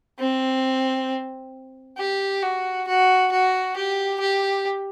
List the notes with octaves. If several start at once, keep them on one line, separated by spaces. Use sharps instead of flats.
C4
G4
F#4
F#4
F#4
G4
G4